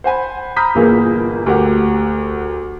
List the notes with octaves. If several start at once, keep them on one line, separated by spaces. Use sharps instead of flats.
C5 F#5 G#5 B5
A#5 B5 D#6 F6 G6 B6
G1 A#2 E3 A#3 G#4
D2 G4 A#4 F#5